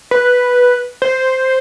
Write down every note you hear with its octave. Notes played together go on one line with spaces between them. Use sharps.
B4
C5